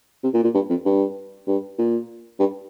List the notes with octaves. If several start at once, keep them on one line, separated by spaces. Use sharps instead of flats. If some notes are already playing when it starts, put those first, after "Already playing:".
C3
A#2
A#2
G2
F2
G2
G2
A#2
G2